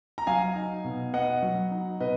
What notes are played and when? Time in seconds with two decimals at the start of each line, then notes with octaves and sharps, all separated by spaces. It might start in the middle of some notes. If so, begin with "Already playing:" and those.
0.18 A#5
0.27 F#3 F5 G#5
0.56 D#4
0.84 B2
1.13 B3 D#5 F#5
1.43 F#3
1.71 D#4
2.00 B2 B4 D#5